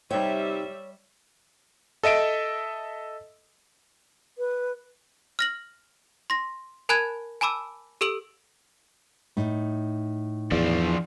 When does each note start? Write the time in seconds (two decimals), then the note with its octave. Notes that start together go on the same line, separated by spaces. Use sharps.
0.11 C3 G3 D#4 G4 C5 C#5 E5 G5
2.03 A4 D#5 E5 D7
4.38 B4
5.39 F6 A#6 F#7
6.30 C6 A#6
6.89 A#4 G#5 A5 B5 F#6 G#6
7.41 G#5 A5 B5 D6 E6
8.01 G4 A4 E6 D7 F#7
9.37 A2 D#4
10.52 E2 F3 D4